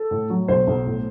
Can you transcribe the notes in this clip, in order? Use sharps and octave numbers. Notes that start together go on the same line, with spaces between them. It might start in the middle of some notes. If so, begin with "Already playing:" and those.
Already playing: A4
A2
F#3
B1 C5
B1
A2